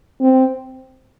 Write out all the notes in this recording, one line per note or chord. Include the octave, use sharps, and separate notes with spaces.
C4